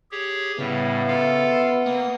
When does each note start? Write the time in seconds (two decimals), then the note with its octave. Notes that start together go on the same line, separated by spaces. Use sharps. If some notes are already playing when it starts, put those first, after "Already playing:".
0.12 G4 G#4 C#5
0.59 A2 C#3 G3 B3 E5
1.08 F4 A4 F5
1.86 A#3 F#5 D#6